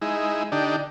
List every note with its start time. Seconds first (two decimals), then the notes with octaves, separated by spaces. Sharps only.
0.02 G#3 D#4 E4
0.52 D3 D4 D#4 G4